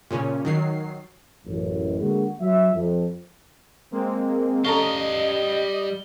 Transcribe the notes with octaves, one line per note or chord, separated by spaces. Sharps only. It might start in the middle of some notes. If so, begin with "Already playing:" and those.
A#2 C#3 C#4
D#3 F#3 C7
A1 F#2
D3 G#3 A#3 F#4
F#3 E5
F2
G#3 A#3 C4
G3 C#4 A4 D#5 F5 A#5 G7